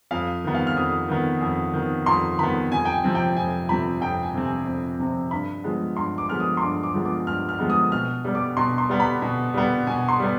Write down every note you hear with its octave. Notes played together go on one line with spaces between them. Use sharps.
F2 F5
D#3 B3
F5
F6
F2 D#6
D#3 B3
F2
D#3 B3
F2 C6
D#3 B3 B5
F2 G#5
G5
G#5
C3 F3 C4
G5
F2 G#5
C3 F3 C4 B5
F2 G5
G#5
C3 F3 C4
G#5
F2
C3 F3 C4
G2 B5
F3 G#3 B3
G2 C6
D6
F3 G#3 B3 F6
D#6
C6
G2 D6
D6
F3 G#3 B3
D6
G2 F6
F6
F3 G#3 B3
D#6
B2 F6
G3 B3
D6
B2 C6
C6
G3 B3
B5
B2
G3 B3
B2 G#5
C6
G3 B3